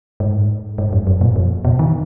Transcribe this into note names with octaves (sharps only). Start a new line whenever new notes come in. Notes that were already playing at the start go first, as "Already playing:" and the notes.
G#2
G#2
F#2
F#2
A#2
F2
B2
D#3